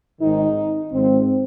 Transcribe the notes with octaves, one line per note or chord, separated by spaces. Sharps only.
G#1 G#2 D#3 D#4
G#1 G#2 F3 C4